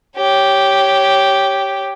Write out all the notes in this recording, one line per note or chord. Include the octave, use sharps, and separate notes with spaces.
G4 C#5